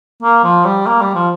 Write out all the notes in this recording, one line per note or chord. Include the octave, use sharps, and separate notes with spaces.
A#3
F3
G3
A#3
G3
F3